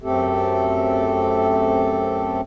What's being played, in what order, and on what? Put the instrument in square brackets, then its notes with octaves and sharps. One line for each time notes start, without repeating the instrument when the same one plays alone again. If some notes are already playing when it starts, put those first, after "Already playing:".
[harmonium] F#2 A3 C4 G4 A4